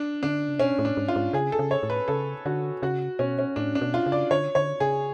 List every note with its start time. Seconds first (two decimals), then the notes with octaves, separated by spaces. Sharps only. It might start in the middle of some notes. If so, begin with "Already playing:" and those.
Already playing: D4
0.23 D3 D4
0.48 C#3
0.59 B2 C#4
0.79 A2
0.85 D4
0.97 G#2
1.08 F4
1.16 G#2
1.33 C#3 G#4
1.52 A4
1.59 C#3
1.71 C#5
1.83 A2
1.90 B4
2.08 C#3 A4
2.46 D3 F#4
2.83 C#3 F#4
3.19 B2 C#4
3.39 C#4
3.56 A2 D4
3.75 D4
3.81 B2
3.94 F4
4.06 C#3
4.12 D5
4.31 D3 C#5
4.55 D3 C#5
4.80 C#3 G#4